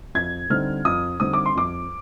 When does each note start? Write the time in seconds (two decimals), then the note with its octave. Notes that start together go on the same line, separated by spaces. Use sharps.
0.15 F2 G#6
0.50 D3 G3 C4 D#4 F6
0.85 F2 D#6
1.20 D3 G3 C4 D#4 D#6
1.33 D6
1.46 C6
1.55 F2 D6